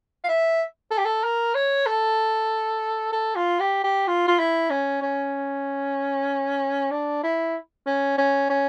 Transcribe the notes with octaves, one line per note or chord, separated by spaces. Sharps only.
F5
E5
A4
G4
A4
A#4
C#5
A4
A4
F4
G4
G4
F4
F4
E4
C#4
C#4
D4
E4
C#4
C#4
C#4